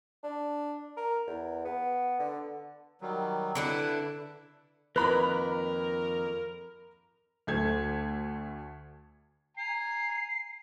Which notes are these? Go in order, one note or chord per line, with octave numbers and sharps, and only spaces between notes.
D4
A#4
E2
B3
D3
D#3 F#3 G3
D3 D4 E4 B4
F2 D#3 A#3 A#4 B4 A#5 B5 F#6
D2 A3 G#6
G#5 A#5 C7